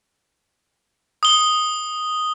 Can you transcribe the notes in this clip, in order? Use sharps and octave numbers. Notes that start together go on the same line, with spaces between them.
D#6 G7